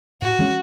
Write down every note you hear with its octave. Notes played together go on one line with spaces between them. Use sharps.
A2 F#4
E3 G#3 C#4